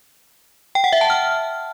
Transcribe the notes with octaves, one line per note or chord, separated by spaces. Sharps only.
G5
F#5
E5
A5
F6